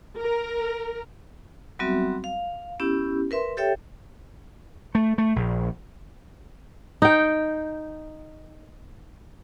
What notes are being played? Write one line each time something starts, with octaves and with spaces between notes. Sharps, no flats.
A#4
F#3 G3 B3 C4 F#4 E5
F5
B3 C#4 E4 G4
A#4 B4 E5 C6
G4 A4 C#5 E5 G5
A3
A3
A#1
D#4 G5